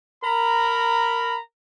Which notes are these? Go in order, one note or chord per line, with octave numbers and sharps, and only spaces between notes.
A#4 A#5 B5